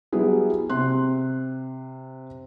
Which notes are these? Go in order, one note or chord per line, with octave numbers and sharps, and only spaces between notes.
F#3 G3 B3 E4 G#4
C3 C6 F#6